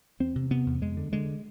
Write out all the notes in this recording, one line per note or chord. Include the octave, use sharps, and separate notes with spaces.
E2 C4
C3
C3 B3
E2
F2 G#3
D3
D3 G#3